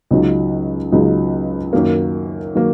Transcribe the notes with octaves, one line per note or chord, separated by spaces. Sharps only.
C#2 C#3 F#3 D#4
C#2 C#3 F#3 D#4
F#2 D#3 F#3 A#3
D#3 F#3 A#3